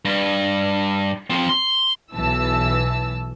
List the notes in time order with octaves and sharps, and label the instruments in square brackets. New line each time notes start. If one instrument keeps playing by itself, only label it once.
[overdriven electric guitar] G2
F3 C4
C6
[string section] B1 E3 A5 E6